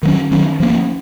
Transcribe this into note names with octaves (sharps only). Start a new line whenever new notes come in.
D#3 F#3 C#4
D#3 F#3 C#4
F3 A#3 C#4